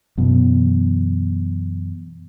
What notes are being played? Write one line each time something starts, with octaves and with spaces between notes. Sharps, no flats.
F#2 B2 E3